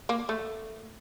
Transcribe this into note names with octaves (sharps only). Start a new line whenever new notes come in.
A#3
A3